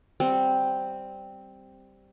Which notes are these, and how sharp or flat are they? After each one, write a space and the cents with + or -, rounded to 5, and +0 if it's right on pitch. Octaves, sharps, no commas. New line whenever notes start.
G3 +0 C4 +0 F#5 -10